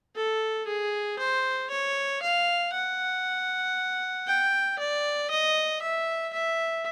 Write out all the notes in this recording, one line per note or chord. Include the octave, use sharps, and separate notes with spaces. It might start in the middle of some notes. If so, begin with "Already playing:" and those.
A4
G#4
C5
C#5
F5
F#5
G5
D5
D#5
E5
E5